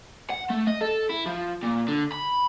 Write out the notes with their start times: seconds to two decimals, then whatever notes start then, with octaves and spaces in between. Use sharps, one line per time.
0.30 F#5
0.50 A3
0.67 D#5
0.81 A4
1.09 E4
1.26 F3
1.63 A#2
1.88 D3
2.12 B5